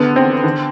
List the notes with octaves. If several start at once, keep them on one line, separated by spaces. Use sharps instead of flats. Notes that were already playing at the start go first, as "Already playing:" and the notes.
Already playing: E2 D3 B3
C4
D3